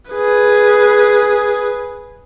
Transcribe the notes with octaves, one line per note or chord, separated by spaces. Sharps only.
G#4 B4